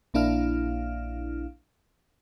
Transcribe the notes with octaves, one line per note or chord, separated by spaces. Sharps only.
A#1 A#3 D4 E4 F5 F6